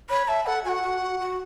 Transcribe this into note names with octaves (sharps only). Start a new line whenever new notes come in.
C#5 B5
E5 A5
A4 F#5
F#4 F#5 G#5
F#4
F#4
F#4